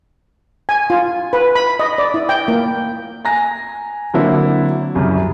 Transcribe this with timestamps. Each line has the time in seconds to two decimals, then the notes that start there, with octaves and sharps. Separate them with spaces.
0.69 G#5
0.90 F4
1.33 B4
1.55 B5
1.79 D#5
1.98 D5
2.14 E4
2.29 G5
2.48 A#3
3.25 G#5 A#5 A#6
4.14 D3 F#3 A#3 C4 E4
4.95 C2 F#2 C#3